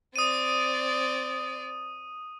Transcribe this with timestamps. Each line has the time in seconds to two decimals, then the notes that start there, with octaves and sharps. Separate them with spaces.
0.16 C4 D5 D#6 D#7